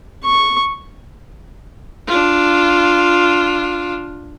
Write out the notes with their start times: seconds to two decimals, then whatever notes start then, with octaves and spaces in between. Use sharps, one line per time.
0.24 C#6
2.07 D4 F4